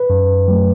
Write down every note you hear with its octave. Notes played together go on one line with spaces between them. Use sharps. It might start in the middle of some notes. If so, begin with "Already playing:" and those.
Already playing: B4
F#2
F#3 A3